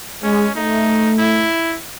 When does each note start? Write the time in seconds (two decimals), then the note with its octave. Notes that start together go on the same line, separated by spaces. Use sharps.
0.23 G#3 C#4
0.55 A3 D#4
1.18 E4